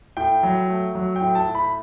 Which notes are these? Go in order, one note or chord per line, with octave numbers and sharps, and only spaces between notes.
A2 G5
F#3
A3
F#3
G5
A2
A5
A2
B5